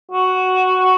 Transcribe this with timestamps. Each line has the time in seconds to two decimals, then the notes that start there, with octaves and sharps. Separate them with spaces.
0.11 F#4